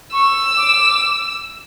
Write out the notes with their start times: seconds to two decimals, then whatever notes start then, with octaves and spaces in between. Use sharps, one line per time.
0.13 C#6 E6
0.57 D6